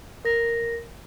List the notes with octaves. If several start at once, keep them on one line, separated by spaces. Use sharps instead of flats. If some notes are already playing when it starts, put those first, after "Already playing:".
A#4 A#6